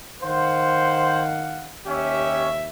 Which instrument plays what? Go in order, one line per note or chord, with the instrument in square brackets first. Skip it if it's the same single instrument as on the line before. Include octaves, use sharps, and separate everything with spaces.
[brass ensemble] D#3 F5 F#5 [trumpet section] C5
[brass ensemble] D#2 E5 [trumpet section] C#4 G4 C#5